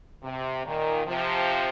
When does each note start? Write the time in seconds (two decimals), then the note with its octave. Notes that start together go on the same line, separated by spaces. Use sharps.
0.23 C3
0.65 A#2 D#3
1.07 C3 F3